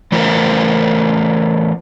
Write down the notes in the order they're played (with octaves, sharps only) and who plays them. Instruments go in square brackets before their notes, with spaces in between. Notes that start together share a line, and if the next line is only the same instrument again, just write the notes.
[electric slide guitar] E3 A3 F4 A#4 C5